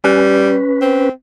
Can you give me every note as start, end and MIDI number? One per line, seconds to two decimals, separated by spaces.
0.04 0.57 55
0.04 1.09 61
0.04 1.09 71
0.81 1.10 60